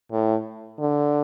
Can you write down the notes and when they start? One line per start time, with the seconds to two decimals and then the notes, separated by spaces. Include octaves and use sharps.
0.12 A2
0.78 D3